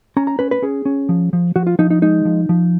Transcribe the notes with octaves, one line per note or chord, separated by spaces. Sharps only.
C#4 A#5
A#5
C#4 B4
B4
C#4 G#4
C#4
F3
F3
F3 F#4
F4
F3 D#4
D#4
G#3 D#4
F3
F3